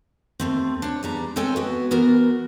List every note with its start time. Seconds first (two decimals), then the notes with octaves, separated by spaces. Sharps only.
0.40 D#2 A3 C4
0.82 D4 C#5
1.03 E2 G3 A#5
1.36 G#3 C4 A4 C#5 G5 G#5
1.56 B3 F#4
1.91 E3 B3 F#4 A#4